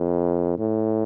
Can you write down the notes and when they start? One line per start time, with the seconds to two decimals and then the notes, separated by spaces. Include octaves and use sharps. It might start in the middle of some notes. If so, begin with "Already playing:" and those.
Already playing: F2
0.58 A2